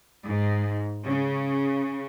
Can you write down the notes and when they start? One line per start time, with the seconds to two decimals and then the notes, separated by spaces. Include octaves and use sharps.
0.24 G#2
1.06 C#3